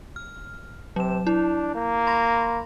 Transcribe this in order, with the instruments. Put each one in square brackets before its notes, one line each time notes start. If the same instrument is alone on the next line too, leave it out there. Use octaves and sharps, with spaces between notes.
[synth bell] F6
[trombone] C3 [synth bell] F#3 E7
[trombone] D4 [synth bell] E4
[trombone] A#3
[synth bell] B5 C6 A#6